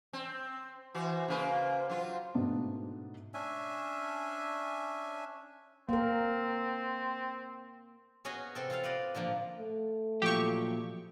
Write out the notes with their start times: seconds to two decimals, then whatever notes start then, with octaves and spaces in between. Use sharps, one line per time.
0.13 C4
0.95 E3 F#4 C5
1.28 C#3 A#3 B4
1.90 F#3 F4
2.34 G#2 B2 A3 B3 D4
3.34 C#4 D4 E5 G#5
5.89 A#3 C4 A#4
8.25 B3 C#4 F#4 G#4 C#5 D#5
8.55 C3 C4 A4
8.70 F4 A4 C5 F5
8.83 B4 C5 D5 D#5
9.15 A#2 D3 F3 A#3
9.59 A3
10.22 A#2 F3 F#3 G4 C#6